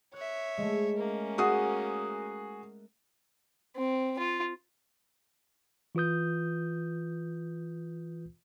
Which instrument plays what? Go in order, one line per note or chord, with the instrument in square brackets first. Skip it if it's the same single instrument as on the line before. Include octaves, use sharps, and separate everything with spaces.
[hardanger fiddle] C#5 E5 [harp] F#6
[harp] G#3 A3
[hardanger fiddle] A#3 C#4
[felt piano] F#4 G#4 D#6
[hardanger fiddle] C4
F4
[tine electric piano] E3 F4 B4 D#6 G6